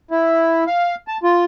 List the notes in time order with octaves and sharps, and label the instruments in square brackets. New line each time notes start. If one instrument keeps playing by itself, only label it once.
[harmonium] E4
F5
A5
F4